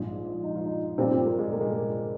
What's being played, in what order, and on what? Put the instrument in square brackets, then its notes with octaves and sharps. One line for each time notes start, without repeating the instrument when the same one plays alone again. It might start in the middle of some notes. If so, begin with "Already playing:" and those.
Already playing: [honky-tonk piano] A#1 G#2 F3 G#3 D4
[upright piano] D#4
F4
D#4
[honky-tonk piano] A#2 G3 D4 F4 [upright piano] C4
[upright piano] C4
A#3
G#3
A#3
G#3
A#3